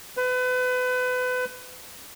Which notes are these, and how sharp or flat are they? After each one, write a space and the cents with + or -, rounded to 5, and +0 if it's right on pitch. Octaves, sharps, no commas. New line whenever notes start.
B4 +30